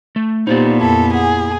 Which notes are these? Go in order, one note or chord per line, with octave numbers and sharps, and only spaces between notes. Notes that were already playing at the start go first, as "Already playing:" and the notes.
A3
A#2 B3 D#4 F4 G4 C5 D5
F2 E4 A4
G#4 F#5 G#5